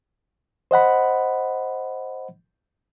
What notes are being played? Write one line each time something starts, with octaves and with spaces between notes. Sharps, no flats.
C5 D#5 F#5 B5